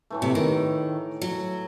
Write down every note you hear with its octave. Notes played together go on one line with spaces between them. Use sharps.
A2 E3 A3
C3
D#3
F#3